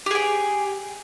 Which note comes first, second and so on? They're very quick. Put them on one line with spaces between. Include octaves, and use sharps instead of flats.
G4 G#4 G5